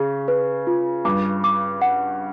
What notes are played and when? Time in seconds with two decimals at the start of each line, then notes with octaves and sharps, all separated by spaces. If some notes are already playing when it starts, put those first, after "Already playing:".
Already playing: C#3 G#4
0.28 B4
0.67 F4
1.05 G2 D6
1.44 D6
1.82 F#5